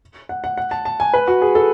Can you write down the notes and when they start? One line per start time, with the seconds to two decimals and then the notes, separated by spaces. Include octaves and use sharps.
0.29 F#5
0.44 F#5
0.57 F#5
0.71 A5
0.85 A5
1.00 G#5
1.14 B4
1.28 F#4
1.42 G#4
1.55 A4